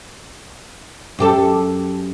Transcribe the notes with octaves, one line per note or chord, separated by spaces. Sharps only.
F#2 G4 A4